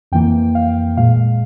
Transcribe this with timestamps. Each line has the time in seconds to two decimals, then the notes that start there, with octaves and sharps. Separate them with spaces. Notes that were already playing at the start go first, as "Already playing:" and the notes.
0.12 F2 E3 A#3 G5
0.55 F5
0.97 A#2 G#3 F5